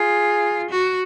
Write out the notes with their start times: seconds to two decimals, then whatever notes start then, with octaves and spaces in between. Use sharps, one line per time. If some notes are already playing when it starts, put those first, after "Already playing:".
Already playing: F4 G#4
0.71 F#4